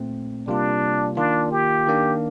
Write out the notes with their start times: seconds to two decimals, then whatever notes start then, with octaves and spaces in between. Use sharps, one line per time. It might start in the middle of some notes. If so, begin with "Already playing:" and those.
Already playing: A#2 A3 C4
0.48 C3 G3 A#3 D4 F4
1.17 D#3 A#3 D4 F4
1.52 G4
1.87 D#3 A#3 D4